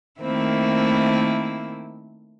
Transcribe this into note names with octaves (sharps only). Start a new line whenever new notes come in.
D#3 A3 A#3 C4 E4